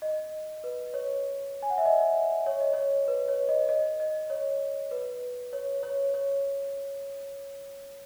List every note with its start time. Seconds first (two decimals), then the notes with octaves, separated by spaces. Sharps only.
0.02 D#5
0.64 B4
0.94 C#5
1.62 G#5
1.70 F#5
1.78 E5
1.85 D#5
2.46 C#5
2.60 D#5
2.73 C#5
3.08 B4
3.28 C#5
3.49 D#5
3.69 D#5
4.00 D#5
4.30 C#5
4.91 B4
5.53 C#5
5.83 C#5
6.14 C#5